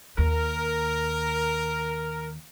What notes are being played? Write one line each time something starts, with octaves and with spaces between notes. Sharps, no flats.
D#2 A#4